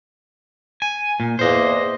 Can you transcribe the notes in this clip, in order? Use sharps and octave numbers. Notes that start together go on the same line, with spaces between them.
G#5
A#2
E2 A#3 C5 D#5